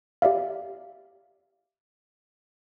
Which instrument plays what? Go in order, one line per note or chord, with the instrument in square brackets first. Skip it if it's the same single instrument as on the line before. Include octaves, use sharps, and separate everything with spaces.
[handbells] G4 D5 E5 F5